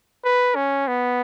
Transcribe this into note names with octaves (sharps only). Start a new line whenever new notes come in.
B4
C#4
B3